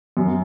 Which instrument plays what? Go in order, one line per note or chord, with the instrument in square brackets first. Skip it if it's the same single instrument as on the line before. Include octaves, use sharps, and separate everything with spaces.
[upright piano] F#2